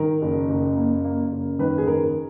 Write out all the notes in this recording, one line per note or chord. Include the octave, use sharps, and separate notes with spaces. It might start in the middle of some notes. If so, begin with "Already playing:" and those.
Already playing: D#3 A#4
F#1
F#1
A#3
A#3
F#1
D#3 B4
G#4
D#3 A#4